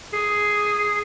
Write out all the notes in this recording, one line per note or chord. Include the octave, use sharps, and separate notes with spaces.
G#4